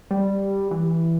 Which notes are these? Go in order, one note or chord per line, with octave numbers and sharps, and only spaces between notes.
G3
E3